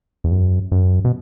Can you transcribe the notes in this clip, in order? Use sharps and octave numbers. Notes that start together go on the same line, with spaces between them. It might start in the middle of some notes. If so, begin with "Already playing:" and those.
E2
F#2
F#2
B2